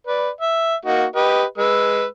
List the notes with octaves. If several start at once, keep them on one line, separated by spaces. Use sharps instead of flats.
B4 D5
E5
A#3 D#4 F#4
G4 B4 D#5
G#3 B4 E6